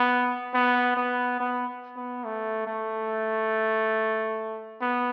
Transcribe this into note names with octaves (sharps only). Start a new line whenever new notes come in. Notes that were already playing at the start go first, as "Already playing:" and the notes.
Already playing: B3
B3
B3
B3
B3
A3
A3
B3